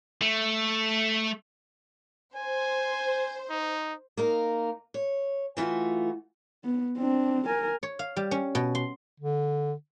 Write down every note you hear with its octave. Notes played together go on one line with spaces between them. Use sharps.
A3
C5 G#5
D#4
A#3 D#4 A#4
C#5
E3 A3 F4 F#4
B3
C4 D4
A#4 G#5
C#5
F5
G3
C#4
B2
C6
D3